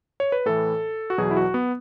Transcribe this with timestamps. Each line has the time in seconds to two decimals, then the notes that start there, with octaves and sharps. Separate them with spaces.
0.20 C#5
0.32 B4
0.46 A2 E3 A4
1.10 F#4
1.18 E2 B2 F#3 G#4
1.31 E4
1.37 F#4
1.54 B3